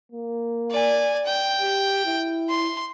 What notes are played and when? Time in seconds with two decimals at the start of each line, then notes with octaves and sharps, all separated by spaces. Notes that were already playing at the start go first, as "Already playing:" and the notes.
0.12 A#3
0.71 D5 G#5
1.26 G5
1.60 G4
2.05 E4
2.49 C6